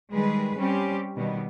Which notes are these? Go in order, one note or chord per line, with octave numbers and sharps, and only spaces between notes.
D#3 G3 G#3 G#4 B4
G3 C4 C#4 G4
B2 D#3 G3 B3